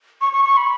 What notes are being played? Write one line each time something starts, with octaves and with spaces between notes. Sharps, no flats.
C#6
C#6
C#6
B5